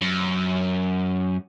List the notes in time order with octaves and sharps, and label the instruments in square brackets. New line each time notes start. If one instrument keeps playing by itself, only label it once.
[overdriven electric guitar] F#2